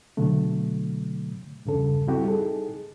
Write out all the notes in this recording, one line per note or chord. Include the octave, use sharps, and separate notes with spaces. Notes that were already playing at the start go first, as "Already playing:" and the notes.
B2 D3 F#3 A3
E2 G2 C#3 A4
G3 C4 E4 F#4 G4 A4
D#4 G#4 A4